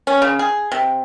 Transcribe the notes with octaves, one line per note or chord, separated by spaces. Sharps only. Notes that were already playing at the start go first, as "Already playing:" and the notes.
C#4
C#3
G#4
C3